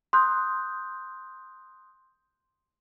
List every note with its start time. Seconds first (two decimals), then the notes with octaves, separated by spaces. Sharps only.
0.13 C6 D#6 F#6 G6